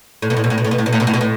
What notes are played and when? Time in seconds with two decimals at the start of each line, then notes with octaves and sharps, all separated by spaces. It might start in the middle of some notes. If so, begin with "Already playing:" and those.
0.22 A2
0.30 B2
0.37 A2
0.44 B2
0.50 A2
0.58 B2
0.65 A2
0.71 B2
0.78 A2
0.86 B2
0.93 A2
1.00 B2
1.07 A2
1.14 B2
1.21 A2